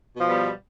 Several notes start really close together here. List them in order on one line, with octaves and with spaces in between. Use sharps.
B2 F3 G3 B3